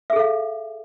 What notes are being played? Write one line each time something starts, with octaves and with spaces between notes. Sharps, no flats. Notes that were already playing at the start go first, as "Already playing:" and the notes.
G#4 A4 E5 F5